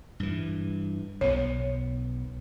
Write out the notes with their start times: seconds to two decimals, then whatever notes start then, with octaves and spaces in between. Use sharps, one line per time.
0.20 G2 E3
1.21 B1 B3 C#5